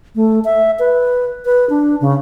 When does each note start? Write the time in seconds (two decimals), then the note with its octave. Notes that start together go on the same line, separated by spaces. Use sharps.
0.15 A3
0.45 E5
0.79 B4
1.45 B4
1.70 D4
2.01 C#3